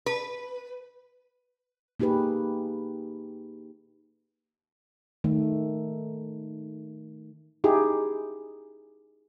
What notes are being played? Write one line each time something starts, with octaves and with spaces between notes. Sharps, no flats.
B4
A#3 D#4 G4 G#4 B4
D#3 A3
D#4 E4 G4 G#4